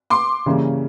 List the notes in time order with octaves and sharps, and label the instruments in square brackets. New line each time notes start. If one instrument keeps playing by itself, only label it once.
[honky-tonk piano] C6 D6
[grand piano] C#3 E3 G3 A#3 C#4